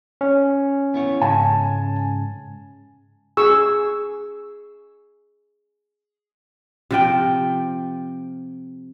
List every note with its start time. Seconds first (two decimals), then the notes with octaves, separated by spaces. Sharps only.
0.21 C#4
0.94 B3 E4 C#5
1.21 G#2 C#3 G#5 A5
3.37 G#4 C#6 E6
6.91 C3 F3 G5